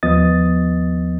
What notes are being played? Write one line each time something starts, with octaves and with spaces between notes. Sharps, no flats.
D#2 F3 B3 D#5 D#6 A6